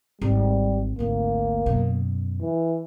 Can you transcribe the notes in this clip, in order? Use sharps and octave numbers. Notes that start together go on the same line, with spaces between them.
G#1 G3
G#1 D2 A#3
F#2 B2
E3